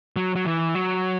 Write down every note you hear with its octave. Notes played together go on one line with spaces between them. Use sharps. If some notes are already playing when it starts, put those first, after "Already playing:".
F#3
F#3
E3
F#3